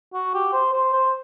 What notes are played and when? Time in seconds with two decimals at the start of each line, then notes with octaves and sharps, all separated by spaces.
0.14 F#4
0.34 G4
0.53 C5
0.73 C5
0.93 C5